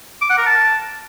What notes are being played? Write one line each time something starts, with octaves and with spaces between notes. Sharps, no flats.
D6
F#5
A#4
A5